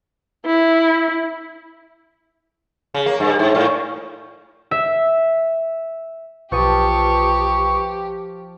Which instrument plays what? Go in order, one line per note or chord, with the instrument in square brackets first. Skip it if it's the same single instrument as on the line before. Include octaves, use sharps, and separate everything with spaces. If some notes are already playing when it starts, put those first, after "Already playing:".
[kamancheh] E4
[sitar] C#3
A#3
G2
G#2
A2
[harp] E5
[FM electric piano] B1 B4 D#6 [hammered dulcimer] F3 A5 [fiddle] G4 [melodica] C#6